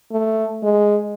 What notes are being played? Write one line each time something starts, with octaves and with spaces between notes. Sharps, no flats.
A3
G#3